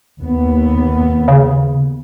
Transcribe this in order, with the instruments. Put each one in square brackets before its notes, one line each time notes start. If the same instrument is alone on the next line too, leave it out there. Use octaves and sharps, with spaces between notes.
[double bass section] D#2 B3
[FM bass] C#3